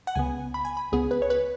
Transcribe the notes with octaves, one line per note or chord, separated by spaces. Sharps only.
F#5
C#2 C#3 B3 G#5
B5
G#5
B5
C#2 C#3 B3 G#4
B4
C#5
B4